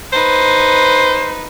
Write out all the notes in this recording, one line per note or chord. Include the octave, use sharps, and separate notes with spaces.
D#4 B4 C5